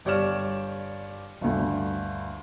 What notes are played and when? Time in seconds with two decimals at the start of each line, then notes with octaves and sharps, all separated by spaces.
0.05 G1 G4 C#5 D5 F6 E7
1.41 G1 D2